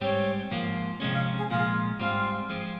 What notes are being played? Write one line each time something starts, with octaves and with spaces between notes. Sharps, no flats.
G#2 G3 C4 G4 C#5
G#2 F3 A#3 F4
C3 F3 G#3 C#4 D#5
F5
G#4
A#2 F3 G#3 F4
G#2 G3 C4 F4
F3 G#3 C4